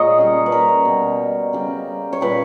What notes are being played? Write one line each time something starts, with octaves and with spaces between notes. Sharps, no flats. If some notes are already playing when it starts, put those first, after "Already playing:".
Already playing: A#2 G#3 G#4 A#4 C#5 D#5
C#3 G3
B4
A#4
B2 G3
C#3 G3
C#5
A#2 G3 B4